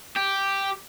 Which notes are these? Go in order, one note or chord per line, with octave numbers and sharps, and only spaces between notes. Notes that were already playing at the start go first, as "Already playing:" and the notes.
G4